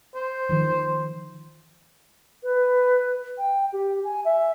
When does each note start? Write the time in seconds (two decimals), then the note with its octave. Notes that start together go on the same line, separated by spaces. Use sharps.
0.15 C5
0.49 D#3 F3
2.43 B4
3.38 G5
3.73 G4
4.04 G#5
4.25 E5